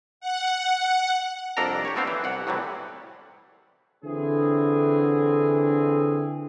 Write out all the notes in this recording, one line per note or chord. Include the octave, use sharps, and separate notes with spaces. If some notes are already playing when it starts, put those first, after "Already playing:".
F#5
C2 F2 D4 A4 A#4 A#5
G4 C#5
A3 B3 C4 D4 C5 F5
E3
C2 F#5
A2 C3 E3 F#3 G3
D3 E3 C4 G#4